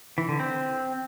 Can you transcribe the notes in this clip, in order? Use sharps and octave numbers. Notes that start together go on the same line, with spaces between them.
E3
D3
C4